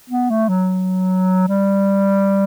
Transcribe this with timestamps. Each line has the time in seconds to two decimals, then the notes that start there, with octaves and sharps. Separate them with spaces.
0.10 B3
0.29 A3
0.49 F#3
1.48 G3